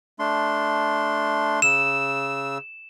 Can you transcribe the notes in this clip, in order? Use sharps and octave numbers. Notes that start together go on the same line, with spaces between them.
A3 D4 C6
C#3 E6 E7